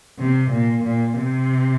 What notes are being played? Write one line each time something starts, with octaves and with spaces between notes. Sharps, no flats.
C3
A#2
A#2
C3